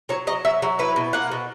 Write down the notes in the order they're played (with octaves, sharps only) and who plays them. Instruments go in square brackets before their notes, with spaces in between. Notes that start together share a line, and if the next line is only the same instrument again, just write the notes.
[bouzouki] F#3 C#5
F#3 D#5
F#3 E5
F#3
E4 B4
B2
A#3 F#5
B2